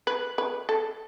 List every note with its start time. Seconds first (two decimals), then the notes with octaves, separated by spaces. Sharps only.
0.07 B4
0.38 B4
0.69 A4